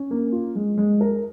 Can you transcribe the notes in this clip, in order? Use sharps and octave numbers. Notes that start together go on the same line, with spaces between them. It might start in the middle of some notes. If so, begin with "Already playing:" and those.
Already playing: C#4
A#3
F4
G#3
G#3
A#4